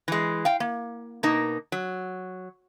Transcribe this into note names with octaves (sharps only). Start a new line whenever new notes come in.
E3 G#3
F5 G5
A#3
B2 A#3 D#4
F#3